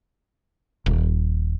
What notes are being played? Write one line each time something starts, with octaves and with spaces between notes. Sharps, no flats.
D#1